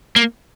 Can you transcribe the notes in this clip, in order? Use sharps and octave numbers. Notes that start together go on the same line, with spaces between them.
A#3